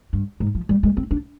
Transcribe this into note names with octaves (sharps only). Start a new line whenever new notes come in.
G2
G#2
F3
G3
G#3
C4
D4